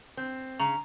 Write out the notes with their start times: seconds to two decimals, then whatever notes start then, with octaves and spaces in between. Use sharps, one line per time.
0.17 C4
0.60 C#3 A#5 C#6 F7